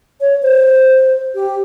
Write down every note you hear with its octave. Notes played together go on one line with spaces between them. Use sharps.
C#5
C5
G4